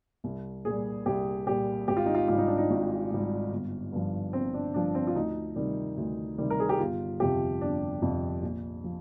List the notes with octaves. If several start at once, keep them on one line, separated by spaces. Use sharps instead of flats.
C2
A#2 G3 G#4
C2 G4
A#2 G3 G4
G#1 G4
F4
D#4
F4
G#2 G3 F4
D#4
D4
D#4
G#1
G#2 G3
G1
G2 F3
G1 C4
D4
G2 F3 D4
C4
F4
D2 D#4
C3 D#3 G3
D2
C3 D#3 G3
A#4
G#4
G4
G1 F4
F2 C3 F3 G4
G1 D4
F2 C3 F3
A#1
F3